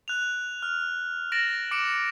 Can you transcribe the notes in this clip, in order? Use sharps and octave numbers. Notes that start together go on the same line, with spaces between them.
F#6 F7
F6
A6 A#6 D7 E7 F#7
D6 C#7 D7 E7